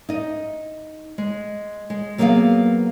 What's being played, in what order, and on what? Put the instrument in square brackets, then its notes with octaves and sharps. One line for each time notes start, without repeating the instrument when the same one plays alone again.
[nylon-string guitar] D#4 D#5
G#3
G#3
F#3 A#3 B3 E4 G#4 F5